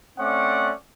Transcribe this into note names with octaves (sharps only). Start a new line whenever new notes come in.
A3 C4 C#4 D5 F#5 D6